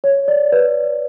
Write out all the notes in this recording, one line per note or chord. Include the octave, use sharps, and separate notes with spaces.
C#5
D5
B4